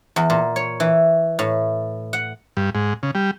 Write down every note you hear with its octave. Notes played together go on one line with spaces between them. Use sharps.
E2
A#2
C#5
E3
A2
F#5
G2
G#2
C#3
G3